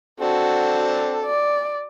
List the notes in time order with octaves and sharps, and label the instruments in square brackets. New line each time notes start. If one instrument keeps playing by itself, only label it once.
[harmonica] C4 D4 A4 [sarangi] F#4
[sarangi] D5